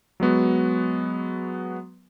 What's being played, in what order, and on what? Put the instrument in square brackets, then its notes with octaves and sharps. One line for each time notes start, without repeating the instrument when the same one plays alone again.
[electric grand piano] F#3 G#3 B3 F#4